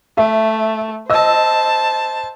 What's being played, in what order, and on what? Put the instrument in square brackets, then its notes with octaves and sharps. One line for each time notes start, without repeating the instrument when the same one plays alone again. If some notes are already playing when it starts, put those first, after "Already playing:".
[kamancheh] A3 [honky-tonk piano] E5
[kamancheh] C5 A5 [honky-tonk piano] D#5 E6